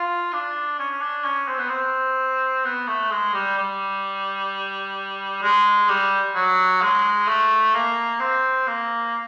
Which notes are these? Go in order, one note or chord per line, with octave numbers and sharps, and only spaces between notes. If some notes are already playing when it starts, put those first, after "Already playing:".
Already playing: F4
D4
C#4
C#4
D4
C#4
C4
B3
C4
B3
A3
G#3
G3
G3
G#3
G3
F#3
G#3
A3
A#3
C4
A#3